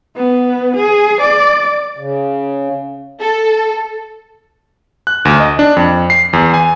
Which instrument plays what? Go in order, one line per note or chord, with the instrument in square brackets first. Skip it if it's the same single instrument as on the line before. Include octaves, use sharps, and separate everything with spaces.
[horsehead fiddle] B3
G#4
D5
[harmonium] C#3
[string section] A4
[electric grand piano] F#6
D2
D#5
D4
F2
C7
E2
G#5